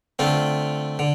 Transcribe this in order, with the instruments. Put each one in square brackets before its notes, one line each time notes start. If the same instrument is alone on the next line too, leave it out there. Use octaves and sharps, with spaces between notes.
[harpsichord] D3 A3 C4 F4
D3